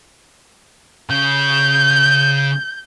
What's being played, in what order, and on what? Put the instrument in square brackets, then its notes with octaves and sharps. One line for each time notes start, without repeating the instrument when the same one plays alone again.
[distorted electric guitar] C#3 [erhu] G6